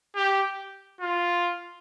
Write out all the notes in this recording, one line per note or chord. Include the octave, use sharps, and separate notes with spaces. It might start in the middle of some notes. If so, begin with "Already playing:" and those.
G4
F4